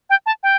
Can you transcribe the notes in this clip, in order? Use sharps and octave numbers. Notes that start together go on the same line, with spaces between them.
G5
A5
G5